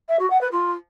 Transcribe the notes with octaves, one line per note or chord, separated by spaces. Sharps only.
E5
F#4
F#5
B4
F4